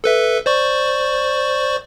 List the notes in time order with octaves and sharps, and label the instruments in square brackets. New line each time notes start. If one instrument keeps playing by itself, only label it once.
[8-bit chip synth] A4 B4 E5
C5 D5 C#6